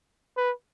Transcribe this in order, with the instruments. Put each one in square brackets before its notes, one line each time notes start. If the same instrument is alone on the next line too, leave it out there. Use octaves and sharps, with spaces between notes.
[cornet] B4